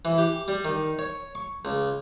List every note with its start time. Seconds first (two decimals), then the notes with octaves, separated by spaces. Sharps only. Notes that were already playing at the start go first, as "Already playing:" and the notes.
0.05 E3
0.18 G4
0.48 G3
0.65 D#3
0.99 C#5
1.35 C#6
1.65 C#2